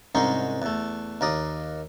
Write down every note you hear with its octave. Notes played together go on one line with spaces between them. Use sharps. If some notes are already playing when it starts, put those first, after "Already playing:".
C2 G#2 C#4 D#4 C#5 C6
E2 A3
D#2 A#4 D5 D#6